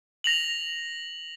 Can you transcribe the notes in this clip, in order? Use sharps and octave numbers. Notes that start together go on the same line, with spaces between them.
A#6 F7 F#7